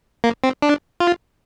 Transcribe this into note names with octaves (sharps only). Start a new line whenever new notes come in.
A#3
C4
D4
F4